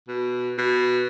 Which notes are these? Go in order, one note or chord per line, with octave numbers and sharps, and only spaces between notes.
B2
B2